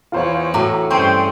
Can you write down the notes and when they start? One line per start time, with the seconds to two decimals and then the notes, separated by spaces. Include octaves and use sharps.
0.12 E2 B3 F4 C5 C#5
0.54 A2 F#4 A#5 D6
0.91 G2 C4 C#4 G#4 C5 G5 C#6